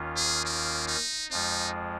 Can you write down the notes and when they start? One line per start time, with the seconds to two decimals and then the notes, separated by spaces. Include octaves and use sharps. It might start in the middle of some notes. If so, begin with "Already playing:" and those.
Already playing: D#2 D#3 C#4 F4
0.16 G#4
0.45 A#3
0.87 D#4
1.31 F2 F3 G#3 D#4 F4